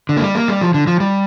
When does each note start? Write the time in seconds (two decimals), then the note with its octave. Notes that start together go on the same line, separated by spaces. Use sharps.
0.09 D3
0.17 A#3
0.22 G3
0.35 A#3
0.48 G3
0.61 F3
0.74 D3
0.87 F3
1.00 G3